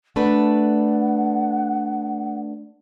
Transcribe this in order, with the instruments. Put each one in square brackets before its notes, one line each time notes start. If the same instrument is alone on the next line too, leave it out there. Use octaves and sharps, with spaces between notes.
[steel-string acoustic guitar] A3 D4 B4 [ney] F#5